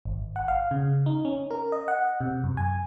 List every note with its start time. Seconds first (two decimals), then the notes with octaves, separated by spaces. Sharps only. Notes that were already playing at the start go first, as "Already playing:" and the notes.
0.05 G#1
0.36 F#5
0.48 F5
0.71 C#3
1.06 D#4
1.25 C#4
1.51 A#4
1.72 D#5
1.88 F#5
2.21 C3
2.44 F#2
2.57 G#5